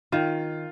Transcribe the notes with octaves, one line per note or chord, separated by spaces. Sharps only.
D#3 F4